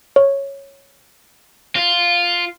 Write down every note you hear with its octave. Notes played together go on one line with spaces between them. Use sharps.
C#5
F4